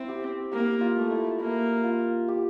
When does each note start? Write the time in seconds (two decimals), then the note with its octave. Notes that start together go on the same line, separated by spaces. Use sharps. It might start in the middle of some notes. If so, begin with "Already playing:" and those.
Already playing: C4 E4
0.08 G4
0.52 A#3 G4
0.81 F4
0.97 A3
1.11 E4
1.39 A#3 E4
1.84 F4
2.28 G4